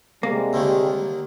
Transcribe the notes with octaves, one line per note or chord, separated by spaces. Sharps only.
C3 G3 G#3 A#3
D#2 D3 D#3